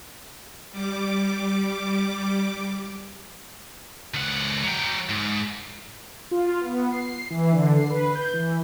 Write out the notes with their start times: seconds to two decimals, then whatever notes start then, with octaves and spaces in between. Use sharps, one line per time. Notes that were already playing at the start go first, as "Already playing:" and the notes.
0.71 G3 D6
4.14 C#2 F#5
4.64 F#3 G5
5.09 G#2
6.31 F4
6.61 B3
6.92 C7
7.30 E3
7.52 D3
7.77 C7
7.90 B4
8.15 G6
8.33 E3